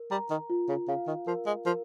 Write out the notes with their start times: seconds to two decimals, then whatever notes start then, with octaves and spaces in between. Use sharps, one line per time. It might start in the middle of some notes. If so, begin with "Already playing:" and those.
Already playing: A#4
0.11 G3 A#5
0.30 D#3
0.50 F4
0.69 C#3
0.88 C#3 F5
1.07 D#3
1.27 F3 A#4
1.46 G#3
1.65 F3 A#4